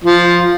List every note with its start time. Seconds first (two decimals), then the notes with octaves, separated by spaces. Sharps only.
0.04 F3